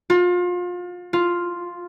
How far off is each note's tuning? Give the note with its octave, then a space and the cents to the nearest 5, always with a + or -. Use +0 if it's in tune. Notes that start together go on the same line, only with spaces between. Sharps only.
F4 +30
F4 +0